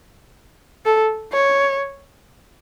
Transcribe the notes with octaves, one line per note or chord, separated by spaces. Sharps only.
A4
C#5